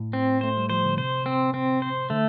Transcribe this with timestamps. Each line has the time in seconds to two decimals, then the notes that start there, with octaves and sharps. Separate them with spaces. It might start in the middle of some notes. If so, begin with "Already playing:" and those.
Already playing: A2
0.13 C4
0.41 A3 C5
0.57 G3
0.70 F3 C5
0.85 D3
0.98 C3 C5
1.26 C4
1.54 C4
1.82 C5
2.10 D3 A3